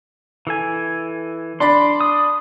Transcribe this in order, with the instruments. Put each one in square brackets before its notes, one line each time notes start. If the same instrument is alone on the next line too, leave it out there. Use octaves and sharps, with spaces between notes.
[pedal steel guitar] E3 A4 G#5
[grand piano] D4 D5 B5 [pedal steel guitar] C6
[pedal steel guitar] D#6